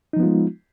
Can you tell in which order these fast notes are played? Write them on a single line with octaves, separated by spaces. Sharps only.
D#4 F3 B3 F4 G#3